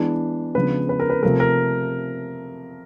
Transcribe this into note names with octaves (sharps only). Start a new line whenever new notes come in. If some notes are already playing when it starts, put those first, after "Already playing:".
Already playing: E3 G#3 B3 D4
C#3 F3 G#3 B3 D4 B4
B4
A#4
B4
C3 F3 A3 A#4
A#4